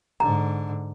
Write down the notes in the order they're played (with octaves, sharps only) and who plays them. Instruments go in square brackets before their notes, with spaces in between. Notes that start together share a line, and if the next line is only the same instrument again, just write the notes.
[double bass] G#2 D3 [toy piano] A#5